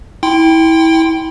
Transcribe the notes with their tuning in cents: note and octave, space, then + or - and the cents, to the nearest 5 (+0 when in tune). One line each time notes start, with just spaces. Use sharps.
E4 -25 G5 +0 C6 -10